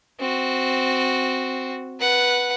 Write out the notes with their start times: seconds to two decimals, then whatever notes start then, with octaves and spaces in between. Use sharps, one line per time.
0.20 C4 F#4
1.99 B4 F#5